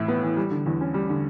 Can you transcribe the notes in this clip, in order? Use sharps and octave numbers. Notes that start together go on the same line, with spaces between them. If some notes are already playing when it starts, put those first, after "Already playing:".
Already playing: A2 E3 E4
B3
E3
G3
D3
E2
C#4
G3
D3